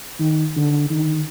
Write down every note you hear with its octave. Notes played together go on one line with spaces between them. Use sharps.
D#3
D3
D#3